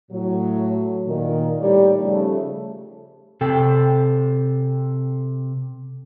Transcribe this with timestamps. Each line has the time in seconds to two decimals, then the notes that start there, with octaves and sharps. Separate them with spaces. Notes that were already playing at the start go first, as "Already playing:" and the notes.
0.11 A2 F#3
1.07 A#2 D#3
1.60 A2 G3 D#4 C#5 D5
2.01 C#3 F3 G3 A3
3.41 C3 A4 G5